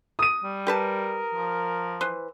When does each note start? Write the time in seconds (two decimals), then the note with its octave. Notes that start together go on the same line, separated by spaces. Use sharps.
0.19 D#6 D#7
0.44 G3
0.67 G4 A#4 B4 A5
1.35 F3
2.01 E3 B4 C5